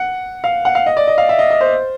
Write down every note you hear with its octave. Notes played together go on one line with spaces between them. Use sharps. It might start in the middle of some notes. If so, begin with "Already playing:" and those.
Already playing: F#5
F5
F#5
F5
D#5
D5
D#5
F5
E5
D#5
D#5
C5